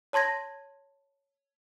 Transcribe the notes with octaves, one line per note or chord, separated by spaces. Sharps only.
C#5 A5 C6 G#6 A#6